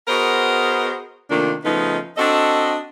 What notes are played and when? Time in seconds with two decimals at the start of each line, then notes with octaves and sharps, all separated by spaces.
0.08 B3 F#4 G#4 A#4 C5 D#5
1.31 C3 D#3 A3 A#3 D4 F4
1.64 C#3 F3 A3 B3 D#4
2.17 C4 D4 F#4 A4 D#5